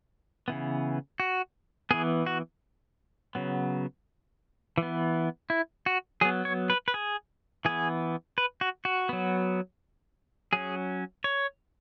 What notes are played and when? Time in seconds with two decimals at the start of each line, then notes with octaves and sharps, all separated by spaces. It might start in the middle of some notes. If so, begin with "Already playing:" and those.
0.48 C#3 E3 B3
1.20 F#4
1.91 E3 B3 G#4
2.26 F#4
3.35 C#3 F#3 B3
4.78 E3 B3
5.50 E4
5.86 F#4
6.21 F#3 B3 G#4
6.45 C#5
6.70 B4
6.88 B4
6.94 G#4
7.65 E3 B3 G#4
8.38 B4
8.61 F#4
8.85 F#4
9.09 F#3 B3
10.53 F#3 C#4 G#4
11.24 C#5